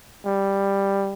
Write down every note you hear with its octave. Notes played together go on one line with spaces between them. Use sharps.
G3